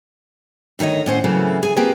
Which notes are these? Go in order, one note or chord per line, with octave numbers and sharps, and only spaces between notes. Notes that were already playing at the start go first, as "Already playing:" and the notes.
D2 D#3 G4 C#5 D#5
A2 C#4 C5 F#5
C#3 E3 F#3 A3 A#3 C4
G#4 G#5
A#3 C4 F4 G4 G#4 B4